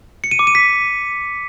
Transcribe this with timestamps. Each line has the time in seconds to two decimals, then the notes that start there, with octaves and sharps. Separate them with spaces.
0.24 C#7
0.31 D#7
0.39 D6
0.47 D#7
0.55 B6